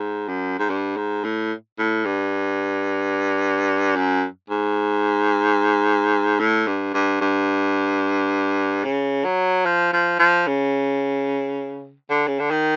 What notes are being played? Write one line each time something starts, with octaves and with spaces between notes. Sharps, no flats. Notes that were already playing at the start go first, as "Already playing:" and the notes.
Already playing: G#2
F#2
G#2
G2
G#2
A2
A2
G2
F#2
G#2
A2
G2
G2
G2
C#3
F#3
F3
F3
F3
C#3
D3
C#3
D3
D#3